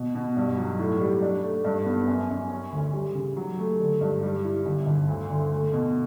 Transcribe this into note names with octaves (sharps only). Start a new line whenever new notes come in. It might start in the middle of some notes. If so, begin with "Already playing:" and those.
Already playing: B2
B2
G2
F#3
A2
G3
D4
A3
G2
B3
F#2
F#2
C#4
D2
G3
C#3
F#3
A3
D3
G2
G3
E4
G1
G1
D2
D3
A3
B2